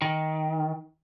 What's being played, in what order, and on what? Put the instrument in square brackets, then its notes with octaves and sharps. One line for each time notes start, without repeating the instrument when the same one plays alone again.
[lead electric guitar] D#3